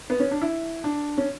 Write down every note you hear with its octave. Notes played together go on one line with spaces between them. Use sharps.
B3
C#4
D4
E4
D4
C#4